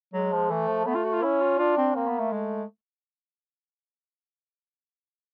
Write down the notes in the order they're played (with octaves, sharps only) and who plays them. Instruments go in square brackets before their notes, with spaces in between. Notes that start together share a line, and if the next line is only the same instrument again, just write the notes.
[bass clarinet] F#3 [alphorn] G#3
[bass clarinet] F3
[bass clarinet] E3 [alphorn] A3
[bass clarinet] F3
[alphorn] A3 [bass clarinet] B3
[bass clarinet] F4
F#4
F4
[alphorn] C#4 [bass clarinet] E4
[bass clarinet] F4
[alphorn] D4 [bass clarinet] F4
[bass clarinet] C4
[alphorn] A#3 [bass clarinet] C4
[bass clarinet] B3
A3
[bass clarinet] G#3 [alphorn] A3